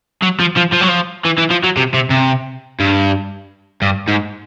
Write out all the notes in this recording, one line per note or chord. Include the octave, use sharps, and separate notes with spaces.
F#3
F3
F3
F3
F#3
F3
E3
E3
F3
F#3
C3
C3
C3
G2
G2
G#2